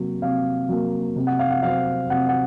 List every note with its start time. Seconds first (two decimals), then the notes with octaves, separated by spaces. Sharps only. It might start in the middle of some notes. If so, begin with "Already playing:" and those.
Already playing: C3 F#3 A#3
0.22 C3 F5
0.69 F#3 A#3
1.16 C3
1.27 F#5
1.39 F5
1.51 F#5
1.63 F#3 C4 F5
2.10 C3 F#5
2.29 F#5